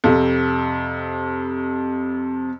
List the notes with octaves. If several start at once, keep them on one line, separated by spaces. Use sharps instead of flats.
F2 C3